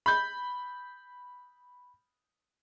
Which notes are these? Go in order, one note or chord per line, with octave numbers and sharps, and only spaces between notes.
B5 G6